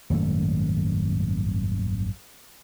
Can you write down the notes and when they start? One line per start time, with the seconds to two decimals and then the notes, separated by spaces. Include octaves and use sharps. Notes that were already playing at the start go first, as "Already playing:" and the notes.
0.10 D#1 G#1 F#2 A3